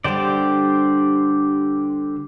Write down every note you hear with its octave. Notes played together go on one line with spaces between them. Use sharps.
D3 G3 G4 C5 D5